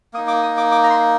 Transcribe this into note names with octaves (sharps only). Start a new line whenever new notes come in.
A#3 D#4 D#6
D6
D#6
D6
D6
A#5
C6